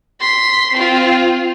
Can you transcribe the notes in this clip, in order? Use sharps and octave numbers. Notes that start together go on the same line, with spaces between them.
C6 B6
C4 F4